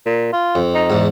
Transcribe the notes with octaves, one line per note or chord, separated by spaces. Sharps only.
A#2
F4
F2
D#4
E2 G#2